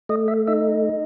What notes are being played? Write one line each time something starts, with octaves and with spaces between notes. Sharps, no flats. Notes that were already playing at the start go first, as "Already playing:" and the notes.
A3 D#5
E5
D#4 E5